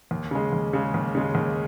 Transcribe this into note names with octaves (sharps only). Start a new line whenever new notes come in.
D#2
C#3 G#3
D#2
C#3 G#3
D#2
C#3 G#3
D#2